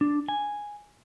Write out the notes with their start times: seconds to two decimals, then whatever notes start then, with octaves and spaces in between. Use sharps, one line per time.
0.01 D4
0.29 G#5